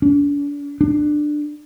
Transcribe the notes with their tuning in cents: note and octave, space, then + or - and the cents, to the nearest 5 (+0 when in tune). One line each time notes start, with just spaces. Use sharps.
D4 -40
D4 +15